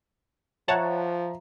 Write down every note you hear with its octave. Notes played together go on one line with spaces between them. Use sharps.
F3 C#5 E5 F#5 A5 A#5